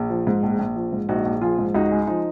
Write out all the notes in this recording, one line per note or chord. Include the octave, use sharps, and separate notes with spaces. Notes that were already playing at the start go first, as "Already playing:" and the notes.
Already playing: A#1
F3
G#2
A#1
A#1
F3
G#2
A#1 D#4 F#4
A#1
F3 F4 G#4
G#2
C#2 D#4 F#4
G#3
F3 D#4